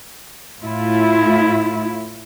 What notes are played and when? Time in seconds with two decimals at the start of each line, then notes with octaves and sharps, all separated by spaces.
0.63 A2 E4 F4